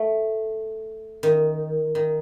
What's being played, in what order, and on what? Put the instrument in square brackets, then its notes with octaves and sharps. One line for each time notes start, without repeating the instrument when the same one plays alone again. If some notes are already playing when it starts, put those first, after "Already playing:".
Already playing: [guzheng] A3
D#3
D#3